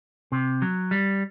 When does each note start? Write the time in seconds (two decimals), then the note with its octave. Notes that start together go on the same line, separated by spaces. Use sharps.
0.32 C3
0.62 F#3
0.91 G3